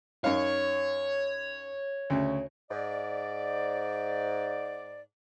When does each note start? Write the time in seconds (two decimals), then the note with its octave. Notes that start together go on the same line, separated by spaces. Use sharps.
0.24 F#2 D#4 C#5 F5
2.10 D2 C#3
2.70 G#2 D5